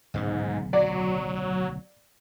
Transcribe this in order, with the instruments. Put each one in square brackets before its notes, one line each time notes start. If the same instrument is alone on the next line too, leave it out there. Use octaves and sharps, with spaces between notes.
[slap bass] D1 B1 C#3 [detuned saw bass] G#2
[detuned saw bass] F#3 [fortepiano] D5